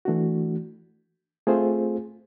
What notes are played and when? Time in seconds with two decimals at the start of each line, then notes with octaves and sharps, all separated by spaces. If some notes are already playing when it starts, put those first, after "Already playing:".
0.05 E3 A3 D4 F#4
1.47 A3 C4 F4 G#4 C5